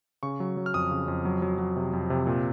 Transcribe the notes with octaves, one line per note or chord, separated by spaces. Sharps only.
C#3 C#6
F#3
F#3
F6
F2 D#6
C#3
F2
F#3
F#3
F#3
C3
F2
C3
A#2